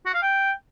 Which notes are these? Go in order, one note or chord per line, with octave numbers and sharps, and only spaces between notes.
F#4
F5
G5